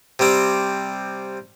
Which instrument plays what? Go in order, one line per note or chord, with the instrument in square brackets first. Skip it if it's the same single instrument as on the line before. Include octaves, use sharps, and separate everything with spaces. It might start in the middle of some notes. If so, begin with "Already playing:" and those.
[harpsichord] C3 G3 C4